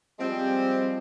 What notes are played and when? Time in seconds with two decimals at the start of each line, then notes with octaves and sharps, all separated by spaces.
0.19 F3 G3 G#3 C4